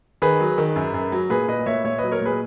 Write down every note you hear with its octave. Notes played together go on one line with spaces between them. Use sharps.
D#3 G#4 B4
F#3
D#3
F#2
F#2
F#3
A#2 G#4 B4
A#2 B4 D#5
A#2 C#5 E5
A#2 C#5 E5
F#3 B4 D#5
A#4 C#5
A#2 G#4 B4